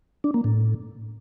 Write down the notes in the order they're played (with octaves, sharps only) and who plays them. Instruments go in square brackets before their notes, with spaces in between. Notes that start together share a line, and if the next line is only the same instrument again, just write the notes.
[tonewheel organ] D4
A#3
A2